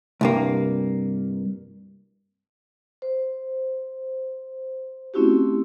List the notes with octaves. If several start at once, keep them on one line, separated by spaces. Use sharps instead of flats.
C2 G2 A#3
C5
A3 C4 C#4 E4 F#4 G4